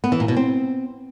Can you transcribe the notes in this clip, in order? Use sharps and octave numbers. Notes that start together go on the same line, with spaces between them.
B3
E3
A#2
B2
C4